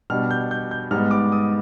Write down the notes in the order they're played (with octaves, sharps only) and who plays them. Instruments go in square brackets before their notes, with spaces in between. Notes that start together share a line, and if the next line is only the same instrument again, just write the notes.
[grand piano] B2 G3 D4 F6
G6
G6
G6
G#2 G3 B3 F6
D6
D#6